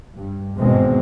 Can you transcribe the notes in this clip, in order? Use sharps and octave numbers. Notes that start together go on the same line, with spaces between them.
G2
G#1 E2 B2 G#3 C4